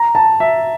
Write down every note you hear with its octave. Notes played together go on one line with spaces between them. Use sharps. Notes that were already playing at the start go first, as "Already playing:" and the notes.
Already playing: A#5
A5
E5